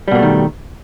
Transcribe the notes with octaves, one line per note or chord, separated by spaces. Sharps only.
B2 D#3 G3 A3 A#3